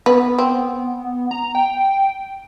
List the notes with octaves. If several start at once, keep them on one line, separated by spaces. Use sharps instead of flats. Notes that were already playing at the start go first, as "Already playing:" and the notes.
B3 B4
C4
A#5
G5